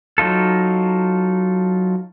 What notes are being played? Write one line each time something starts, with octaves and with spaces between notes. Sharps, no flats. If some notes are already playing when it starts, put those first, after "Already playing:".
F#3 D#4 F4 A4